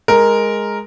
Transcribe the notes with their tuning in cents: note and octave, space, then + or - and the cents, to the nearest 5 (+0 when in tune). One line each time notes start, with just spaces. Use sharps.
G#3 +0 A#4 +0